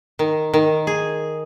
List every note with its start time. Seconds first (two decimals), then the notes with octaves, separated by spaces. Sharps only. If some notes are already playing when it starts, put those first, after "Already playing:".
0.19 D#3
0.54 D#3
0.87 G#4